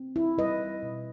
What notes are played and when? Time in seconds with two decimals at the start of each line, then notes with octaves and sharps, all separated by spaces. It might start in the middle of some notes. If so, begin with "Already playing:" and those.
Already playing: C4
0.16 E4
0.38 G3 B4 D#5
0.83 B2